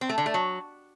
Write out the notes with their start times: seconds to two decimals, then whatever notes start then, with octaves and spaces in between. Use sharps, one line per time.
0.01 C4
0.09 A3
0.18 D3
0.26 A3
0.34 F#3